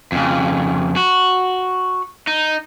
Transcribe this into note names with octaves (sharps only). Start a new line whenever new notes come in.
F2 C#3
F#4
D#4